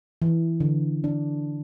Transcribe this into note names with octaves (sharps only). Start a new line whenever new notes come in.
E3
D3
D4